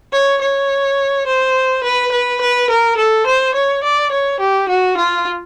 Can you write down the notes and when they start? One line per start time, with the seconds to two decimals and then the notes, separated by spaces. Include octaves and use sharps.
0.12 C#5
0.41 C#5
1.26 C5
1.83 B4
2.11 B4
2.41 B4
2.70 A#4
2.97 A4
3.26 C5
3.54 C#5
3.83 D5
4.11 C#5
4.40 G4
4.69 F#4
4.97 F4